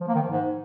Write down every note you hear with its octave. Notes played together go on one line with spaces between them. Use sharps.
F3
A#3
D#3
F3
G#2